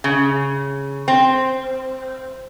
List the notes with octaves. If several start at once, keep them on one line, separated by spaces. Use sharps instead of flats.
C#3
C4